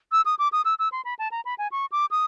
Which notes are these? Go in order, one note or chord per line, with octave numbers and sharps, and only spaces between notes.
E6
D#6
D6
D#6
E6
E6
C6
B5
A5
A#5
B5
G#5
C#6
D6
D#6